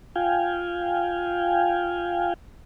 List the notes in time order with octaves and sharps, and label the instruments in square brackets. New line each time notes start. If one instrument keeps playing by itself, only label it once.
[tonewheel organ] F4 F5 G5 G#5